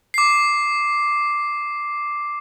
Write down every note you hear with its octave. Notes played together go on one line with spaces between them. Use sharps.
D6 C7